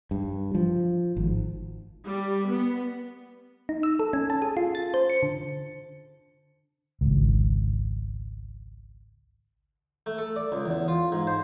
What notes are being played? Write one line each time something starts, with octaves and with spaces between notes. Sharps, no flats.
G2
F3
G#1
G3
B3
D#4
E6
A4
C#4
A5
G#4
F4
A6
C5
C#7
D3
G#1 C#2
A3
A4
D5
C#2
E2
F4
G#2
C5